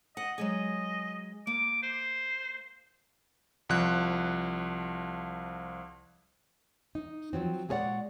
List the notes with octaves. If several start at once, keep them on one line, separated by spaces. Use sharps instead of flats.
D#5 F#5
F#3 G#3 G#4 D#5
A#3 D6
C5
C2 F3 F#6
D#4
F3 F#3 C4
A#2 G#3 G#4 C#5 D5 F#5